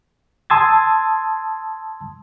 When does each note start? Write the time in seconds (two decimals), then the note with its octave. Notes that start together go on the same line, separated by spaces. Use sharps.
0.50 A5 C6 D#6 E6 G#6 A6